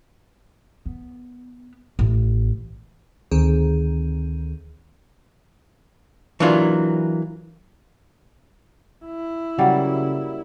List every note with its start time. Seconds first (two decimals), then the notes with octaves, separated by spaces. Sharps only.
0.86 B3
1.99 A1
3.32 D2 D#3 C4 G#4
6.40 E3 F#3 A#3 D4 F4
9.06 E4
9.58 C#3 F#3 G3 A#3 F#5